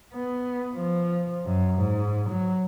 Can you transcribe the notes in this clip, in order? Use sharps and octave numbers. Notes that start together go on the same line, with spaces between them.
B3
F3
F#2
G#2
F#3